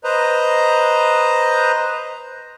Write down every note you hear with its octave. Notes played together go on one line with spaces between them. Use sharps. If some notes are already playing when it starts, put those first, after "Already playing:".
B4 C5 D#5 A#5